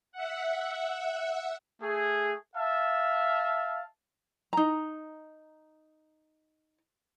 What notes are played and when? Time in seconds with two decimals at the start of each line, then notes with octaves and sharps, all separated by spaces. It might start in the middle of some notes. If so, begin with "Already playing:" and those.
0.12 E5 F#5
1.81 A3 G#4
2.56 E5 F5 A5
4.53 D#4 A#5